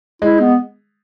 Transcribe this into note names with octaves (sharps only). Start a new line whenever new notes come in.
G#3 E4
B3